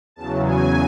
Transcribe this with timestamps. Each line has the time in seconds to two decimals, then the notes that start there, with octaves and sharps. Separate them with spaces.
0.16 E2 C#3 F#3 A5
0.44 G#5